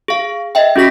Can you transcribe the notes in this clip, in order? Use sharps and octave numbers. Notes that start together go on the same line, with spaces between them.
G#4 F5
D#5 E5 G5
C#4 F#4 G#4 A#6 B6